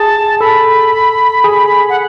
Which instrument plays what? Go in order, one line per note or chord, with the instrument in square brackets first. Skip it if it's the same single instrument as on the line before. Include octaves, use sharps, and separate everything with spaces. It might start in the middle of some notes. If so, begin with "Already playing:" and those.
Already playing: [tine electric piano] G#4 [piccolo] A5
[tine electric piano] A4 [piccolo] B5
[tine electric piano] G#4
[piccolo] F#5